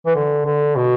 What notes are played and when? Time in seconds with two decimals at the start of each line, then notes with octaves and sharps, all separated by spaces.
0.06 E3
0.15 D3
0.46 D3
0.77 B2